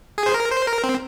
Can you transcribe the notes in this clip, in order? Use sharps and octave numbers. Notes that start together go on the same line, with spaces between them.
G#4
C5
A#4
C5
A#4
C4